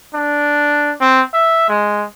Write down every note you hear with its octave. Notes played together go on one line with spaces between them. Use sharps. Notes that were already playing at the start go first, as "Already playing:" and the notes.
D4
C4
E5
G#3